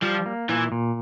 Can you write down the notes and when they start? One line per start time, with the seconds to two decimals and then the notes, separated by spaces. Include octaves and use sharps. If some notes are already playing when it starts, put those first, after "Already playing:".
0.02 F3 G3
0.26 A#3
0.49 A#2 E3
0.72 A#2